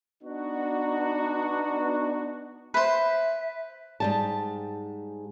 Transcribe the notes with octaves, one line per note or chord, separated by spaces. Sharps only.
B3 D4 D#4 F#4
B4 C5 E5
G#2 G3 A5